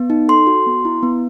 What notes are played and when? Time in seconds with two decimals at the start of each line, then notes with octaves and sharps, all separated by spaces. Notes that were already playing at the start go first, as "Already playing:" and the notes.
Already playing: B3
0.10 D#4
0.28 A4 C6
0.47 F#4
0.66 B3
0.85 E4
1.03 B3